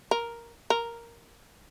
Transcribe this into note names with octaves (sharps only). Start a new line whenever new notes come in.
A#4
A#4